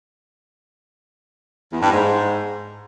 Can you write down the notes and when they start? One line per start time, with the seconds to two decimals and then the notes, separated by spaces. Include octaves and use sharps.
1.72 E2
1.81 G2
1.90 G#2